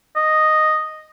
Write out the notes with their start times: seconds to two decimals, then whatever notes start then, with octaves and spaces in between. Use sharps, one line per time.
0.16 D#5